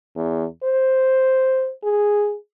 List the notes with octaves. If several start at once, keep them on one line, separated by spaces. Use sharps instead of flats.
E2
C5
G#4